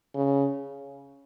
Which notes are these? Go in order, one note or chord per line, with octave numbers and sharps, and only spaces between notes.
C#3